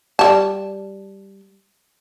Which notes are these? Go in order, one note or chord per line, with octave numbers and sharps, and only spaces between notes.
G3 A5